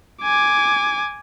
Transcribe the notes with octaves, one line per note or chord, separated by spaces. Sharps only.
G#5 D6